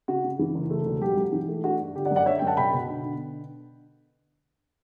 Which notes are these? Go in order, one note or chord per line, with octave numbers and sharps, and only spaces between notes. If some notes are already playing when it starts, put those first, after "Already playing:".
C#3 F#4
C#3
E3
F#1
A3
E1
F#3 G4
F#3
E3
A3
D4 F#4
G2
G1 G4
D5 F#5
F#2
D5 F#5
D3 C#5 E5
F#2 G5
F#5 A5
B2 G5 B5
B2
D3
D3